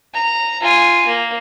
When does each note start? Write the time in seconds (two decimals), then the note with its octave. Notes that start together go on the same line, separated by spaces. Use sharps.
0.14 A#5
0.61 F4 G#5
1.07 A#3